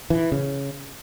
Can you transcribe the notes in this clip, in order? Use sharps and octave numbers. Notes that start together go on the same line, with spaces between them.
E3
C#3